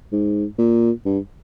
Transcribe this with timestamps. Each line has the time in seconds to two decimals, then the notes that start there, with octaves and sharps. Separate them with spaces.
0.12 G#2
0.58 A#2
1.05 G2